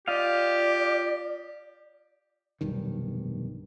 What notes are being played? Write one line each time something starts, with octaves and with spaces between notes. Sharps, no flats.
F4 G4 D5 D#5 F5
F1 B1 G2 D#3